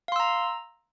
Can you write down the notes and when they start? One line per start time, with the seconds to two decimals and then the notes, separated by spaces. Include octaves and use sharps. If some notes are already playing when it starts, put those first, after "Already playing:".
0.08 F5
0.12 C6
0.16 E6
0.20 A#5